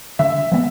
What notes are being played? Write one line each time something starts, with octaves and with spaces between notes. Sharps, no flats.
D3 E5
F3 G#3 B3